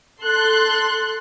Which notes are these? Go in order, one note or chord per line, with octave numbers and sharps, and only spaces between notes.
A4 C6 F#6